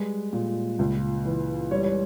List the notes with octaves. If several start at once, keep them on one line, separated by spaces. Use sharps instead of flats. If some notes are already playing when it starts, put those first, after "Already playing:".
Already playing: G3 G#3 B4
A#2
C#2
E3
G3 C#5
C#5